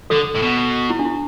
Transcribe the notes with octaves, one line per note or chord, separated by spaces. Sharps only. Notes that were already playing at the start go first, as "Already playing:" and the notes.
D3 A4
A2
B2
E4
D4
E4